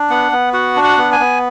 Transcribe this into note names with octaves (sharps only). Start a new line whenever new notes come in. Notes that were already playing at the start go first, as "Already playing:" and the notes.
Already playing: D4
B3 F#5
B3
F#4 F#5
D4
F#5
B3
G#5
B3